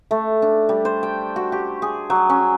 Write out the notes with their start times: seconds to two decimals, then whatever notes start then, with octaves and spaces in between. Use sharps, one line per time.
0.11 A3
0.42 D4
0.69 G3
0.85 C5
1.03 G5
1.36 F#4
1.52 G4
1.82 G#4
2.10 F#3
2.29 C#4